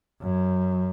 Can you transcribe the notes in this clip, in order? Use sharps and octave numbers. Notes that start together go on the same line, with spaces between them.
F#2